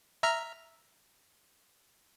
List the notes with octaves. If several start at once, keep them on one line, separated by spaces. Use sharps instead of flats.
E5 A#5 F6